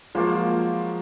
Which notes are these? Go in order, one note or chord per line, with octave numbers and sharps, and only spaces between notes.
F3 F#3 G#3 A#3 F4